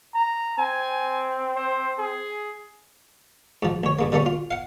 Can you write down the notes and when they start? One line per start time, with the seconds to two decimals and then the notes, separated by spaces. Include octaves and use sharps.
0.15 A#5
0.58 C4 G#5
1.56 C5
1.98 G#4
3.63 G#2 F3
3.83 D2 C#5
3.99 G2 C#3 A#3
4.12 D3 G3 A3 A#3 C#4
4.26 F4
4.51 F5 F#5